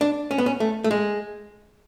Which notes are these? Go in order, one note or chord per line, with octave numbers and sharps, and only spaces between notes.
D4
C#4
B3
C#4
A3
A3
G#3